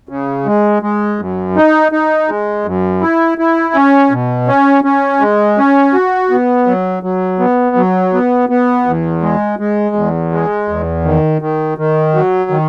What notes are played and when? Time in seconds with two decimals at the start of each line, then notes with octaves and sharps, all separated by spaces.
0.09 C#3
0.46 G#3
0.82 G#3
1.20 F#2
1.56 D#4
1.92 D#4
2.28 G#3
2.65 F#2
3.02 E4
3.38 E4
3.74 C#4
4.11 B2
4.47 C#4
4.84 C#4
5.20 G#3
5.57 C#4
5.94 F#4
6.30 B3
6.67 F#3
7.03 F#3
7.39 B3
7.76 F#3
8.13 B3
8.49 B3
8.86 E2
9.22 G#3
9.59 G#3
9.95 E2
10.32 G#3
10.69 E2
11.05 D#3
11.42 D#3
11.78 D#3
12.14 F#3
12.50 D#3